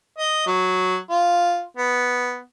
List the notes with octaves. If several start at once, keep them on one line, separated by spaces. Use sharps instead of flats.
D#5
F#3
F4
B3